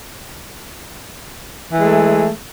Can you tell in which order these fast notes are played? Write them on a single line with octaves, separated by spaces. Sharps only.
E3 G#3 A3